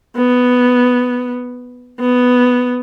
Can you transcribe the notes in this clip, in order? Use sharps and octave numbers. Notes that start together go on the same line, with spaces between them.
B3
B3